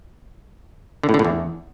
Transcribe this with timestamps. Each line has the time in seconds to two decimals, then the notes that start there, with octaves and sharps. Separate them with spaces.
1.03 D3
1.09 A2
1.14 D3
1.19 A2
1.24 E2